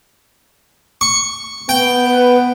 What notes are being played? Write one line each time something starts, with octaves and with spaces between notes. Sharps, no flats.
C#6
B3 G5
B4